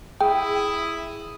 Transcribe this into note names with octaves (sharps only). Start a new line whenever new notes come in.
E4 G#4 G5 D#6